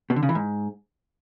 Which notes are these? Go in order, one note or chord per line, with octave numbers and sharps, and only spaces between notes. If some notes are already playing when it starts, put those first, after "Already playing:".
B2
D3
C#3
E3
G#2